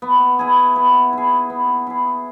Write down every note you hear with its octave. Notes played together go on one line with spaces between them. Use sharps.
B3
E4 G#4
B3
E4 G#4
B3
E4 G#4